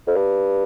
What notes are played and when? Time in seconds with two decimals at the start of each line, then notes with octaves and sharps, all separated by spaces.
0.07 F2
0.16 G2